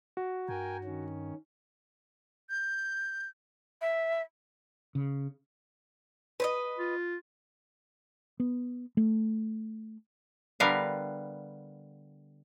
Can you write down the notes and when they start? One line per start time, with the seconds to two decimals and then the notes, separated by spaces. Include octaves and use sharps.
0.17 F#4
0.48 G2 A#4 G5 G#5
0.84 D#3 C#4
2.50 G6
3.81 E5
4.95 C#3
6.40 B4 C5 D#5
6.78 F4
8.40 B3
8.97 A3
10.60 D3 G3 B3 A#4 F5